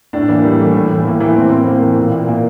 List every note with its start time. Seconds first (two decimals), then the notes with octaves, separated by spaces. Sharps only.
0.13 A2 D4
0.29 E3 A#3
0.43 A2 G3
0.59 E3 A3
0.74 A2
0.90 E3
1.05 A2 A#3
1.20 E3 A#3
1.36 A2 C4
1.50 E3 C4
1.66 A2 A#3
1.82 E3
1.97 A#2
2.11 A#2
2.27 A#2 A#3